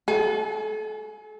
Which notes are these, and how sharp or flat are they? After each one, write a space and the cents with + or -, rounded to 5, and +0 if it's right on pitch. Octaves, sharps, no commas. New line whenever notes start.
A4 -35 G#5 +25